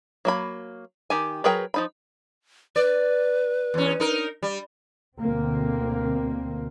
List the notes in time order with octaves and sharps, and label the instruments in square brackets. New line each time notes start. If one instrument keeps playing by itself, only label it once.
[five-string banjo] F#3 A#3 B5
D#3 G4 G#5
F#3 G#4 A#4 B4 G5
F3 D#4 B5
[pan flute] B4 [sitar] D5
[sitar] E2 C#4
D#4 A#4
G3
[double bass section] D2 B2 D3 A#3 C4